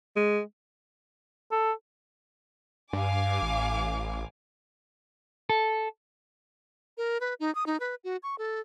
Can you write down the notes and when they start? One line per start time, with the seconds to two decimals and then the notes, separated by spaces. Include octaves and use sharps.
0.16 G#3
1.52 A4
2.93 G2 F5 G#5 D6
3.42 A1
5.49 A4
6.98 A#4
7.21 B4
7.40 D#4
7.55 D#6
7.66 D#4
7.80 B4
8.04 F#4
8.23 C#6
8.39 A4